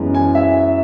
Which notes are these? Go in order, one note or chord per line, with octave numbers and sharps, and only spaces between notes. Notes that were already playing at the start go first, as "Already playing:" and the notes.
Already playing: F#2 E3 G#3 B3
G#5
E5